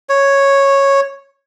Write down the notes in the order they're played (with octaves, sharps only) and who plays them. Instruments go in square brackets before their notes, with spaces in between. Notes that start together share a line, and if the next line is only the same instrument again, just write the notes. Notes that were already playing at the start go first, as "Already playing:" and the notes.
[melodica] C#5